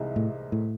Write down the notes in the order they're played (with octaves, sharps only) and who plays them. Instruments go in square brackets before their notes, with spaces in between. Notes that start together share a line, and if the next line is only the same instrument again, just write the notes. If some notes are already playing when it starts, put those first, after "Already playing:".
Already playing: [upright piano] C2 C3 E3 G#3 D#4
[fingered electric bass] A2
A2